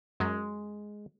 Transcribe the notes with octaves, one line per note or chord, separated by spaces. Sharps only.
F#2 G#3